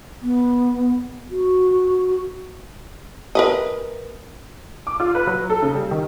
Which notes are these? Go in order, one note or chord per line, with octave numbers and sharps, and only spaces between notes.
B3
F#4
A#4 B4 D#5
D6
F4
B4
F#3
A4
C#3
G3
D#3